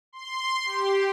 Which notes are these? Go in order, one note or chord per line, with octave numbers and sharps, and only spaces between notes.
C6
G4